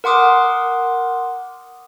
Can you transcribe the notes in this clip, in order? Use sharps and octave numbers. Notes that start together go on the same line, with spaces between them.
A#4 F#5 C6 D6 D#6